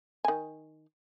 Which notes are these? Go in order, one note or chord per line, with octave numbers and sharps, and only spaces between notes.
D#3 G#5